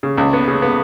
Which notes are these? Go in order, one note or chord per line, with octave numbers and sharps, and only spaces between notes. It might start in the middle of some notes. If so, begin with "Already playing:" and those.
C#3
C#2
B3
C#3
B3